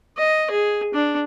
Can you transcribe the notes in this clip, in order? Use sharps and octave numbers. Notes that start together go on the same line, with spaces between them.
D#5
G#4
D4